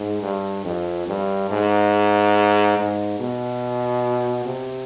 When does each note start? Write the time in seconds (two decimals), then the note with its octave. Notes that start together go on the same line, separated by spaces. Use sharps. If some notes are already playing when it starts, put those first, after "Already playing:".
Already playing: G#2
0.23 G2
0.65 F2
1.08 G2
1.50 G#2
2.77 G#2
3.19 B2
4.45 C3